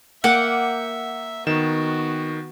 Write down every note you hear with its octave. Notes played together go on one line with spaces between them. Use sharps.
A#3 E5 F#5 G5 D6
D#3 B3 F#4 E7